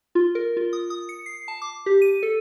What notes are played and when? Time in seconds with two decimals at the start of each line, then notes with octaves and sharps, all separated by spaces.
0.15 F4
0.35 A#4
0.57 F4
0.73 D#6
0.90 D#6
1.09 C#7
1.26 C7
1.48 A5
1.62 D6
1.86 G4
2.02 D#7
2.23 A4